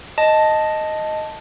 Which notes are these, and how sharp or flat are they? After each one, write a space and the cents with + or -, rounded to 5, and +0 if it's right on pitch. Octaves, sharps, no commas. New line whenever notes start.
D#5 +0 A5 +0